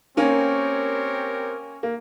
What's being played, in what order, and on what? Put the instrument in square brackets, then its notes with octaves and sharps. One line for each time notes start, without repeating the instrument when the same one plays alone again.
[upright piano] A#3 C#4 [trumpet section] C4 G4 A#4 C#5
[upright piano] A#3